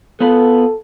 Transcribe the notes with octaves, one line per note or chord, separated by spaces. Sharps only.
B3 F4 A4 B4